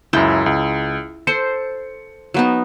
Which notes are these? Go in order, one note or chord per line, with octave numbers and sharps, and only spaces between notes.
C#2 F#2 E4 G5
C#2
A4 C5 C#7
F#3 B3 D#4